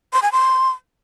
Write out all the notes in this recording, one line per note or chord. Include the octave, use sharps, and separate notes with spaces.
C6
G#5
C6